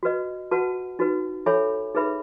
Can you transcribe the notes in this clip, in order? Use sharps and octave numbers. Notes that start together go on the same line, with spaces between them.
F#4 B4 D#5
F#4 B4 F#5 A5
D#4 F#4 B4
A4 C#5 E5 G#5 B5
D#4 G#4 B4 E5 B5